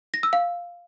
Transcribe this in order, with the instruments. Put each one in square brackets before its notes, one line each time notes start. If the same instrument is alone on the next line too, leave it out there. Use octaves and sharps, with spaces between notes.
[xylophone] A#6
E6
F5